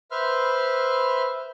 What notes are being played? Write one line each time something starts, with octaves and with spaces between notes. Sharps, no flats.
B4 C5 E5 C6 F6